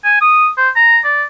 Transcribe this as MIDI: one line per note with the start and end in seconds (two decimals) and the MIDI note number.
0.05 0.16 80
0.21 0.48 87
0.58 0.69 72
0.76 0.99 82
1.04 1.23 74